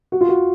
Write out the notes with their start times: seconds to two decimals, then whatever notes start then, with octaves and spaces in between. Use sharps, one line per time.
0.12 F#4
0.21 F4
0.29 F#4